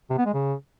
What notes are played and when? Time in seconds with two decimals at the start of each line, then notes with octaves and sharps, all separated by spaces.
0.10 C3
0.18 B3
0.26 G#3
0.34 C#3